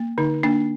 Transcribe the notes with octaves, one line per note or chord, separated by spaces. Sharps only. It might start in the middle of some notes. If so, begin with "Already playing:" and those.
Already playing: A#3
D3 D#4
A#3 D4